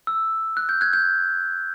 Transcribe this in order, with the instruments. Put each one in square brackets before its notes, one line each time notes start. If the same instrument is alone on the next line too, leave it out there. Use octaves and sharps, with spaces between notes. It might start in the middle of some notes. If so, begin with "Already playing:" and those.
[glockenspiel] E6
F#6
G6
F#6 G#6
G6